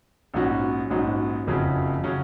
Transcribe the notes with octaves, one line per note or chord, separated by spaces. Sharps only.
A#1 G#2 F#3 C#4 F#4
A#1 G#2 F#3 C#4 F#4
F#1 F2 C#3 F#3 C#4
C#3 F#3 C#4